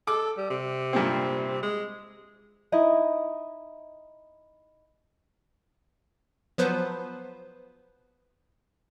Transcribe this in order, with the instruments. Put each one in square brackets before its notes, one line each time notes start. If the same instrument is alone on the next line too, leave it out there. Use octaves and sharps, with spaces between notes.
[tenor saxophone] A4 [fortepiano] D6
[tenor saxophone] G3
C3
[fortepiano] G2 A#2 C4
[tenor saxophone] G#3
[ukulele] D#4 E4 D#5
[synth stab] F3 F#3 B3 B4 C5